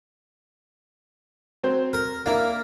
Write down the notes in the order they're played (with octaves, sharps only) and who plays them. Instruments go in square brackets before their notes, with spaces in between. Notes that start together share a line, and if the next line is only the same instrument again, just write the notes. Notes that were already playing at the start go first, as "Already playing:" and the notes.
[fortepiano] F#3 C4 C5
[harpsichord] A#4
[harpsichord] A#3 [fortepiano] D4 E4 A#4